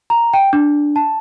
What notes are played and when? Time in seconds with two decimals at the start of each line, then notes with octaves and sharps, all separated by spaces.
0.10 A#5
0.34 G5
0.53 D4
0.96 A5